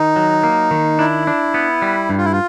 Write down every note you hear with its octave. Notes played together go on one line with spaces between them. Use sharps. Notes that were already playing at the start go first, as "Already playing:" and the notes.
Already playing: D#3 D#4
F#3
A#3
D#3
D4 E4
D4
B3
G3
G2
F4
E4
F4